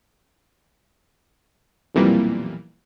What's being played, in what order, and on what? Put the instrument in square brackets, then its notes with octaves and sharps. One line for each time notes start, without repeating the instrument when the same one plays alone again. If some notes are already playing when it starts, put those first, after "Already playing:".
[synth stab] B1 F2 A#2 E3 G3 A#3